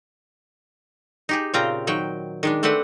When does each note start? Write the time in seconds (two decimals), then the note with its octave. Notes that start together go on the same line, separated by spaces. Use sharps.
1.29 D#4 G4 G#4
1.54 A#2 C#3 C4 F4 G5 A#5
1.87 D#3 F#3 G5
2.43 D#3 G#3 D4
2.63 A3 C4 D4 B4 F#5